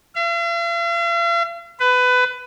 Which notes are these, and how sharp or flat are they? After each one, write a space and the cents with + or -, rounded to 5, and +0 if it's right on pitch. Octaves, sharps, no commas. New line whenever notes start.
F5 -45
B4 +20